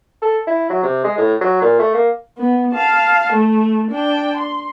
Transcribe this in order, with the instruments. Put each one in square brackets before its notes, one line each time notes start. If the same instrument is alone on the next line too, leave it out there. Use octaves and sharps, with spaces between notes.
[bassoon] A4
E4
F#3
C3
G#3
A2
F#3
A#2
A3
A#3
[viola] B3
F5 A5
A3
D4 G5
C6